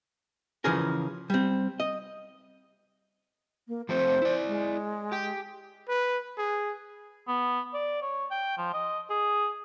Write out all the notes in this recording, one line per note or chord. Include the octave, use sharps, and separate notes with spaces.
C#3 E3 F3 C#4 G#4 A#4
G3 C4
D#5
A#3
F3 A3 C4 C5
E4 D5
G#3
G4 G5
B4
G#4
B3
D5
C#5
G5
F3
D#5
G#4